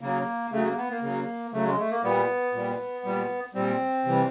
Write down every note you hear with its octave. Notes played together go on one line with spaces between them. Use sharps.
C#3 F#3 A#3
C#3 F#3 A3
A#3
B3
A#3
C#3 F#3
C#3 F#3 A3
G#3
A3
A#3
A#2 G3 B3
A#2 G3
A#2 G3
A#2 G3 C4
C3 E3 G3